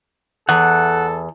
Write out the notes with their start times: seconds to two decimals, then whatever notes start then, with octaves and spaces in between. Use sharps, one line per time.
0.49 E2 A4 F#5